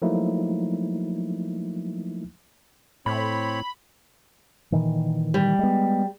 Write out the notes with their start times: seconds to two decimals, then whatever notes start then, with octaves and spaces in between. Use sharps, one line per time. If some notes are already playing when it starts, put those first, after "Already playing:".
0.02 F3 F#3 A3 A#3 D#4 E4
3.06 A2 C4 C#5 B5
4.72 A#2 D#3 E3
5.34 G3
5.59 G#3 B3